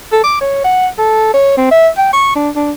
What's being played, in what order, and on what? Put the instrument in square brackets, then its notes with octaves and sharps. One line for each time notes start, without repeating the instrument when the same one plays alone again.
[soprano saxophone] A4
D6
C#5
F#5
A4
C#5
C4
E5
G5
C#6
D4
D4